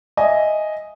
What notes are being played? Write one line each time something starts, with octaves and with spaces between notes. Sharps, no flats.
D#5 E5 G#5